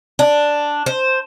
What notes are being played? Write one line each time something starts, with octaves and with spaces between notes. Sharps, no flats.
D4
C5